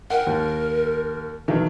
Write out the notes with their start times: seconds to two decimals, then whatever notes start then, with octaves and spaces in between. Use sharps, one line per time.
0.10 A#4 F#5 G5
0.27 D#2
1.48 B1 D#3 E3